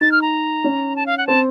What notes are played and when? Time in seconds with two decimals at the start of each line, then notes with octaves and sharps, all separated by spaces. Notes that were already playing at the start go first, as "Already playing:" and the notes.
0.01 D#4 A6
0.12 F6
0.22 A#5
0.64 C#4
0.96 A5
1.06 F5
1.18 F#5
1.27 C4 A5